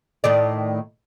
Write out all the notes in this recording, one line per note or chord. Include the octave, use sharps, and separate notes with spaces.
A2 D#3 D5